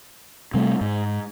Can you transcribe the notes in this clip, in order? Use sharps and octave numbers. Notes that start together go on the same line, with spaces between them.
C3 G3 A3
G#2